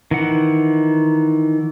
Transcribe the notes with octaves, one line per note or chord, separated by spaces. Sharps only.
D#3 E3 F#5